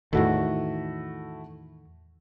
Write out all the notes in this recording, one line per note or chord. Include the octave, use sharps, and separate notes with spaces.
E2 A2 D#3 A3 E4 F#4